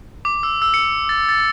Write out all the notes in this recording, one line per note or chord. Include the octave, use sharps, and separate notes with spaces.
D6
E6
E6
C#7
A6
A6